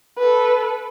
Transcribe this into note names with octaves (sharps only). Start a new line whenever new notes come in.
A4 B4